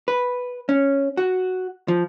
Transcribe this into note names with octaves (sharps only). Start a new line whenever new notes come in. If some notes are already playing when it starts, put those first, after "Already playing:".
B4
C#4
F#4
F3